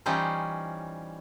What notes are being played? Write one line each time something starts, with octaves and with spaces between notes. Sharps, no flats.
E3 G3 C#4 D#4 F4 C5